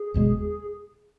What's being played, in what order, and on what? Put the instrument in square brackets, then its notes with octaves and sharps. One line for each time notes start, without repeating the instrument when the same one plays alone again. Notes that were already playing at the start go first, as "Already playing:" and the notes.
Already playing: [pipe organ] G#4
[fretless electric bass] F#1 E2 B2 G#3